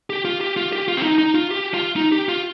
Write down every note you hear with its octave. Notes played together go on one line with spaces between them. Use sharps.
G4
F4
G4
F4
G4
F4
C4
D#4
D#4
F4
G4
F4
D#4
G4
F4